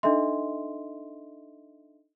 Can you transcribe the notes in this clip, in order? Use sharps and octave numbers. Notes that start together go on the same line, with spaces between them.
D4 D#4 A4 D#5 E5 C6